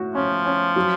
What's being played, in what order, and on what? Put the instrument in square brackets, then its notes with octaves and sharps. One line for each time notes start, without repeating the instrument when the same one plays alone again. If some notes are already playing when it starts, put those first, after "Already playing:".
Already playing: [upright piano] A2 F#4
[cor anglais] F3 [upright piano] C#4
[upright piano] C#4
F#3